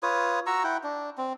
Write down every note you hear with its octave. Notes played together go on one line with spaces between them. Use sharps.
F4 B4 C#5 D#6
F#4 A#5 C#6 E6
E4 F#5 G5
D4
C4